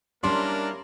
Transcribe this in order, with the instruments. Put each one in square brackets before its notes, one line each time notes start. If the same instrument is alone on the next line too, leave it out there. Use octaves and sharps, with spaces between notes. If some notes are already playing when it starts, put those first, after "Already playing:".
[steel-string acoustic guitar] G3 C#4 [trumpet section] A#3 E4 A#4 [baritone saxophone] D4 [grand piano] C6